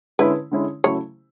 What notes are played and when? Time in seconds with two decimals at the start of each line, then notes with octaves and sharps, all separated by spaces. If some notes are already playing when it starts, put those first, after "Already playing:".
0.19 D3 G#3 C#4 E4 B4
0.51 D3 G#3 C#4 E4
0.84 C#3 F#3 A3 E4 C#5